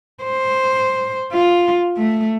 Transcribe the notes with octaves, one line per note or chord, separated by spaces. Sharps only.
C5
F4
A3